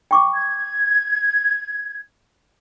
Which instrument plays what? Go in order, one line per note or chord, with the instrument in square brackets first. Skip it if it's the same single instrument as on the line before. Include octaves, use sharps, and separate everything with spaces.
[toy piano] G5 C#6 D6
[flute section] G#6